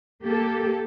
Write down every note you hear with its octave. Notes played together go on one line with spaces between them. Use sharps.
A#3 G4 A4